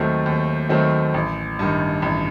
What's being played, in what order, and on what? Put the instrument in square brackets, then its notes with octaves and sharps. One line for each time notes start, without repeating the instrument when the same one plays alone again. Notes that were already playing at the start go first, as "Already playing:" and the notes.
Already playing: [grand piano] D#2 D#3 F#3 A3 C4
D#2
D#3 F#3 A3 C4
A1
G2 D#3
A1